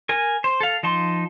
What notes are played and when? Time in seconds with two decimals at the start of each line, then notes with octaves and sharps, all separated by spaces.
0.09 A#4 G#5
0.44 C5
0.61 A4 F5
0.83 F3 D#4 A5 C6